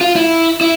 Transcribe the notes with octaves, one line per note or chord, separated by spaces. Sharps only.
F4
E4
E4